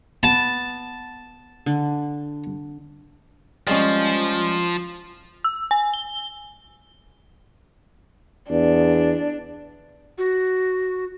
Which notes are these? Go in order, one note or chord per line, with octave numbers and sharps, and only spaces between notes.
B3 A5
D3
F3 G3 G#3 C#4
E6
G#5
G7
E2 D4
F#4